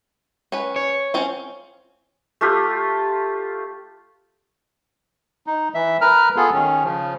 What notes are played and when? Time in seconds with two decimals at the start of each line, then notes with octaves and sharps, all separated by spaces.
0.52 C#4 B4
0.76 C#5
1.14 C4 C#4 F4
2.41 A3 F4 G4
5.47 D#4
5.75 E3 E5
6.01 A#4 B4 A#5 F6
6.36 B3 F4 G#4 A4
6.53 D#3 C#4
6.84 C#3 F3